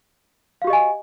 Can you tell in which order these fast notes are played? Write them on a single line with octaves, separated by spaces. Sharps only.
F5 F#4 G4 D#5 G#5